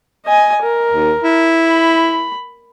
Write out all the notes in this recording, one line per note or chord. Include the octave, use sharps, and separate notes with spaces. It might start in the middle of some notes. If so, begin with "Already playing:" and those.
D#5 G#5
A#4
D#2
E4
B5